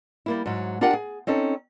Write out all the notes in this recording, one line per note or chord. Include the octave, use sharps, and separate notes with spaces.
G3 A#3 E4
G#2 F#3
D4 F4 G4 A#4 F#5
G#4
C4 C#4 D#4 A4